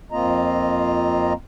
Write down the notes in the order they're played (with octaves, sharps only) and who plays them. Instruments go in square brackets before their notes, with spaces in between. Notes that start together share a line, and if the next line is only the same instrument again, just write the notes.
[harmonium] F2 A#3 C4 F4 D#5 A#5